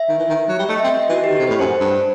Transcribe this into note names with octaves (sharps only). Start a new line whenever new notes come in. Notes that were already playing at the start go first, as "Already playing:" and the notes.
Already playing: E5
D#3
E3
D#3
F#3
G3
A3 D#5
C4 E5
D#5
E3 F#4
G4
D#3
C3 A4
A2 B4
F#2 C5
G2